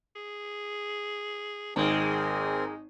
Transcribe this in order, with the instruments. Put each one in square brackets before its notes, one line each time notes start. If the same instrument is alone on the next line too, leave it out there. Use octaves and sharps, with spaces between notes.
[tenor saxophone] G#4
[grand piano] G#1 [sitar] G#3 A#3 [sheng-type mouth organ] C4 G#4 A#4 [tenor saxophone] D#4